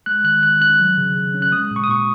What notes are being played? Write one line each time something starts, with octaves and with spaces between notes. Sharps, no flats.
G#3 F#6
D#3 F#6
D#3 F#6
C#4 F#6
F#3
C#3
C#3
C#4
F#6
G#3 D#6
A#2
C#6
D#6
A#2 C#6